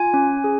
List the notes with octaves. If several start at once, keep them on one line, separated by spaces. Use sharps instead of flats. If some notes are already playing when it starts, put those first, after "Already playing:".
Already playing: F4 G#5
C#4
G#4